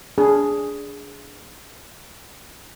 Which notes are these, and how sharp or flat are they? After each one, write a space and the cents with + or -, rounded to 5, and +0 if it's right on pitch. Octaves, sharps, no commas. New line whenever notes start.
D4 -20 G#4 +0